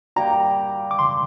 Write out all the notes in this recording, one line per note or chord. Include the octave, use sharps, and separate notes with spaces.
G3 A#3 G4 A#5
D6
C6